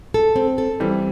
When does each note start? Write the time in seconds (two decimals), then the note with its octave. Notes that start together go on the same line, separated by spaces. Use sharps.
0.14 A4
0.36 C4
0.58 A4
0.80 E3 G3 C4